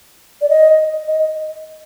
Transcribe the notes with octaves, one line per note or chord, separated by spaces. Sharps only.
D5
D#5
D#5